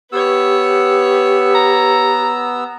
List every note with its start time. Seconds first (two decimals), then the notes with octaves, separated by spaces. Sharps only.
0.12 B3 G4 B4 C#5 E6
1.55 A#5